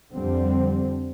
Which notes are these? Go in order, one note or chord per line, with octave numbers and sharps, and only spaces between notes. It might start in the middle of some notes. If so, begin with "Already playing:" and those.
F2 D3 G3 C4